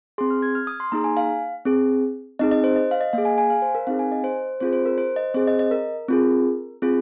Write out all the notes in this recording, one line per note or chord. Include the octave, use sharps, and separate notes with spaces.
C4 G#4 C6
F6
G#6
F6
D#6
C6
A#3 D#4 G#4 A#5
G#5
F5
C4 G#4
C4 D#4 G#4 D#5
D#5
C5
D#5
F5
D#5
A#3 G#4 F5
G#5
G#5
F5
C5
A#4
C4 D#4 G#4 F5
G#5
D#5
C5
C4 F4 G#4 C5
C5
A#4
C5
D#5
C4 G#4 C5
D#5
D#5
A#4
C4 F4 G#4
C4 F4 G#4